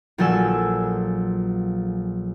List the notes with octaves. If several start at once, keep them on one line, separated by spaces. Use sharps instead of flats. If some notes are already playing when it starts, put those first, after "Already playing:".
A#1 F3 F#3 A4 G#5 E6